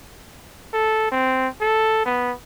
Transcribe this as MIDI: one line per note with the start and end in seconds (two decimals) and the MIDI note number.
0.73 1.11 69
1.11 1.48 60
1.61 2.05 69
2.05 2.32 59